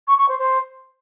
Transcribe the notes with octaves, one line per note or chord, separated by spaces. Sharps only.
C#6
C#6
C5
C5